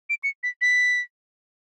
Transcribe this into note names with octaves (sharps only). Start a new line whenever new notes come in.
D7
C#7
B6
B6